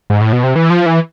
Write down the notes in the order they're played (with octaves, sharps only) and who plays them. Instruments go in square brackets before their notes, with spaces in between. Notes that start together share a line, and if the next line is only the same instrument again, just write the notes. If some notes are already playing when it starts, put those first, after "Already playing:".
[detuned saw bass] G#2
A2
B2
C3
E3
F3
E3